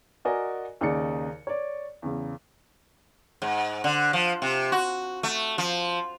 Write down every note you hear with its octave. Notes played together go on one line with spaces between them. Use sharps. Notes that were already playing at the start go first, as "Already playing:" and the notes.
F#4 A#4 D5 D#5 G#5
D#2 C#3 D#4 G#4 D5 C#7
C#5 D5
E2 C#3
G#2
D3
F3
C3
F#4
A3
F3